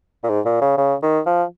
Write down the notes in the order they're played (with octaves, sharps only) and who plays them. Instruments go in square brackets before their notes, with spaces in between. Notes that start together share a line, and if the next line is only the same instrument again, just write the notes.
[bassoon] A#2
G#2
A#2
C#3
C#3
D#3
F3